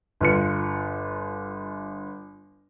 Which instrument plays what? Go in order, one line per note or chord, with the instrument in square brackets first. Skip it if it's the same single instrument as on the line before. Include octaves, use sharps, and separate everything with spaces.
[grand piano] G1 F4 C#7